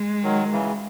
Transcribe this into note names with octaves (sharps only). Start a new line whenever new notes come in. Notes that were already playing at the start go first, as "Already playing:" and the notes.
Already playing: G#3
D#3 F#3
C#3 E3